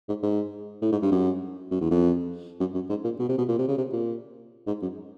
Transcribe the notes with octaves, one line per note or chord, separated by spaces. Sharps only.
G#2
G#2
A2
G#2
G2
F#2
F#2
E2
F2
F#2
F#2
G#2
A#2
B2
C3
B2
A#2
C3
C#3
C3
A#2
G#2
F#2